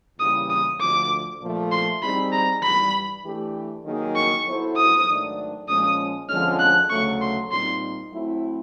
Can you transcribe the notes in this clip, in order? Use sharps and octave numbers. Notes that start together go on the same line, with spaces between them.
E2 C#3 E3 G3 A#3 D#6
D#6
D2 D3 F3 D6
A#2 F3 A3
C6
G3 C4 D#4 G#4 B5
A#5
G2 E3 G3 B5
E3 A3 D4 G4
D#3 F#3 A#3 D#4 G#4
C#6
F#3 B3 E4 A4 C5
D#6
G#2 D#3 F#3 A3 D4
A#2 F3 G#3 C#4 D#6
F2 D3 F3 G#3 C#4 F6
F#6
D2 C#3 F#3 A3 C#6
C6
A#2 G3 C4 D#4 C6
F#3 A3 C4 E4